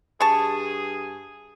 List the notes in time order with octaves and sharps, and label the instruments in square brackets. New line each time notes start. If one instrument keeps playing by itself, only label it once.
[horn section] G2 G#4 [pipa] A5 C#6